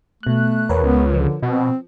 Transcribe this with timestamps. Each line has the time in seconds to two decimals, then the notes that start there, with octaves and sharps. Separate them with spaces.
0.23 B2 A3 F#6
0.69 E2 A#4 B4 C#5
0.83 C#2 B3
1.14 D3 F3
1.42 B2 C4